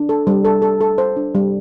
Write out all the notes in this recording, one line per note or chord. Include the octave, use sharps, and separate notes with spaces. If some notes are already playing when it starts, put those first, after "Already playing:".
Already playing: D4
A4
G3
A4
A4
A4
C5
D4
G3